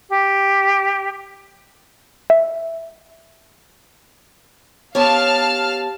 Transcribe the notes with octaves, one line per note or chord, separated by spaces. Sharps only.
G4
E5
B3 G4 C#5 F5 A5 F6